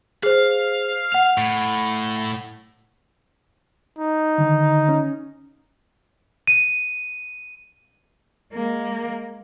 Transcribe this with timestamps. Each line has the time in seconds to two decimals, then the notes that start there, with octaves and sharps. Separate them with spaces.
0.23 G#4 C5 F5
1.12 F#5 F7
1.38 A2
3.98 D#4
4.38 D3 D#3
4.89 C#4
6.47 D#7
8.53 G#3 A#3